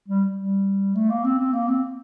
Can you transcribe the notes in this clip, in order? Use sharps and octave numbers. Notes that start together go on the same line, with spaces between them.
G3
G3
A3
A#3
C4
C4
A#3
C4